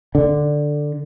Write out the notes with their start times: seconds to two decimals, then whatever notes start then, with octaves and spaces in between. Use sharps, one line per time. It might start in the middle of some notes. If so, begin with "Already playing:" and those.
0.15 D3